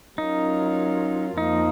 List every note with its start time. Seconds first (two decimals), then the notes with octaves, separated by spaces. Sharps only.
0.18 F#3 C#4 D#4 F4 A#4
1.37 F2 F3 A#3 D#4